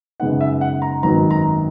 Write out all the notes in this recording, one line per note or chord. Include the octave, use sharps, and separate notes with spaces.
F#2 C#3 G#3 B3 D#4 F#5
E5
F#5
A#5
G#1 F#2 D#3 F#3 B3 A#5
A#5